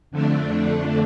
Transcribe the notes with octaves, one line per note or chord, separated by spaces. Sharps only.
F2 D3 A3 D4